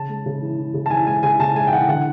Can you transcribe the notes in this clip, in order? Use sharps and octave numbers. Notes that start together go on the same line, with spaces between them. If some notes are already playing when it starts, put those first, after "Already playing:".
Already playing: C#3 A5
G#3
C#3
E3
E3
C#3
A5
E3 G#5
G#3 G#5
C#3 G#5
C#3 A5
G#3 G#5
G5
E3 F#5
D3 F#5